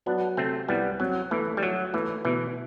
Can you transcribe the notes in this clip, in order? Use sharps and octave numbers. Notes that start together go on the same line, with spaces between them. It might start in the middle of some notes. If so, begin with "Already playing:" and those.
F#3 B3 D4
C3 A3 C4
C2 G3 B3
F#3 C4
E3 A3
G3
F#3 F#4
E3 A3
B2 E3